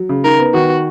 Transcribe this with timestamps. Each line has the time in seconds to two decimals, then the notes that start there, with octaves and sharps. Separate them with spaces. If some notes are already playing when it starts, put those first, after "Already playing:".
Already playing: F#3
0.09 C#3
0.24 D#4 A#4
0.39 B3
0.54 D#3 F#4